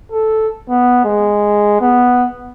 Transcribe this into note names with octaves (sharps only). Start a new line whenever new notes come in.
A4
B3
G#3
B3